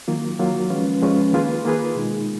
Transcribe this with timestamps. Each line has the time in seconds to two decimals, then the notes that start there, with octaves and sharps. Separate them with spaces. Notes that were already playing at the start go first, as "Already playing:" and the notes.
0.08 D#3 F#3 A#3 F4
0.39 D#3 F#3 A#3 F4
0.70 F3 G#3 C#4 F4 B4
1.02 F3 G#3 C#4 F4 B4
1.33 D#3 A#3 F4 G#4 B4
1.65 D#3 A#3 F4 G#4 B4
1.95 B2 G#3 D#4